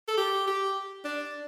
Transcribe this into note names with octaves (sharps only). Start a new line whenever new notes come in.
A4
G4
G4
D4